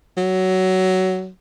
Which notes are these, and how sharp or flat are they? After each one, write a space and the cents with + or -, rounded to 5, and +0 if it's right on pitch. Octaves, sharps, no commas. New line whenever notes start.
F#3 +15